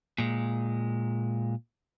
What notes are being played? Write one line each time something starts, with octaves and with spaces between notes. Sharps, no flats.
A#2 G#3